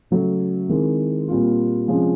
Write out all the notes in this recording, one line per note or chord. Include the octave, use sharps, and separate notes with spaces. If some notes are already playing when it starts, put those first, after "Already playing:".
C#3 F#3 A3
D#3 G#3 C4 E4
A#2 G3 C4 F4
C3 F3 G#3 C#4